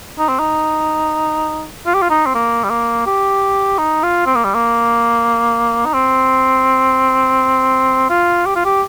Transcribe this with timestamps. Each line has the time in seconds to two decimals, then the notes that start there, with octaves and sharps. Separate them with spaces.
0.19 D#4
0.29 C4
0.39 D#4
1.86 F4
1.95 G4
2.02 F4
2.10 D#4
2.26 C4
2.35 A#3
2.64 G3
2.70 A#3
3.06 G4
3.78 D#4
4.03 F4
4.26 C4
4.35 A#3
4.44 G3
4.54 A#3
5.86 D#4
5.94 C4
8.10 F4
8.46 G4
8.55 F4
8.65 G4